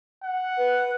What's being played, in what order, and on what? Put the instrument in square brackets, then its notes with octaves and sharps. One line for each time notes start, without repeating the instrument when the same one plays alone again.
[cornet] F#5
[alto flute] B4